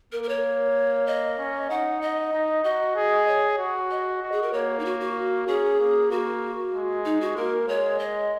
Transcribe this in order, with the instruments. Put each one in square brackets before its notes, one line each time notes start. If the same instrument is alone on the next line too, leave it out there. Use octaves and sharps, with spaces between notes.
[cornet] A#3 [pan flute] A#4
[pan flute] A#4
C#5
D#5
[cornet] C#4
[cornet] D#4 [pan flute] F#5
[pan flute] D#5
[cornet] D#4
[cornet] F#4 [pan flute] D#5
[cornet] G#4
[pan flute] C#5
[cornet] F#4
[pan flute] D#5
[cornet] F#4
[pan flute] G#4
A#4
[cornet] A#3 [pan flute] C#5
[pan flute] D#4
F#4
F#4
[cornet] C#4 [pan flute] G#4
[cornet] A#3
[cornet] A#3 [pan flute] F#4
[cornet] G#3
[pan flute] D#4
F#4
[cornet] A#3 [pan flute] A#4
[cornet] G#3 [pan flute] C#5
[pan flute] D#5